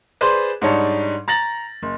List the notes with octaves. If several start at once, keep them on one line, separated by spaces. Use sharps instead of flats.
G#4 B4 C5 D5 C6
G#2 G3 D4 D#4 C#5 A5
A#5 A6 A#6 F#7
F#1